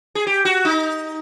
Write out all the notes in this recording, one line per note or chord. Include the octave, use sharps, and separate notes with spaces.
G#4
G4
F#4
D#4